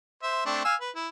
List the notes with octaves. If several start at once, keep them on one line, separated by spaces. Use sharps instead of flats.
C5 E5
A3 C4 D4
F5 G#5 E6
B4
E4